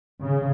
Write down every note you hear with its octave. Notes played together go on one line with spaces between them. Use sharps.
C#3